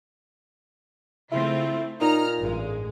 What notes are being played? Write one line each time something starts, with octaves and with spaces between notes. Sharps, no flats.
C#3 A3 C4 E4 F4
A#2 D#4 A#5 F6
A1 G2 G#3